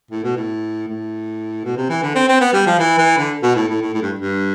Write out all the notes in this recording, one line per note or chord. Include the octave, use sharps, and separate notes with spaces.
A2
B2
A2
A2
B2
C3
E3
D3
C4
C4
B3
G3
F3
E3
E3
D3
B2
A2
A2
A2
A2
G2
G2